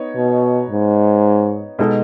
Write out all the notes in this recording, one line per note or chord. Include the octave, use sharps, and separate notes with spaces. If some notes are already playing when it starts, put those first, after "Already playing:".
Already playing: B3 D#4 C#5
B2
G#2
B2 G#3 D#4 A4